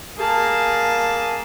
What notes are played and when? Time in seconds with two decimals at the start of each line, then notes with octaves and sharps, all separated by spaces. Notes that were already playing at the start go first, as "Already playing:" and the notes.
0.18 A#3 G#4 A5